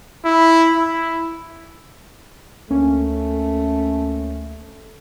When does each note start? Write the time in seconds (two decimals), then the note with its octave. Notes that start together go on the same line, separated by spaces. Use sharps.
0.25 E4
0.75 E4
2.70 D2 A3 A#3 C#4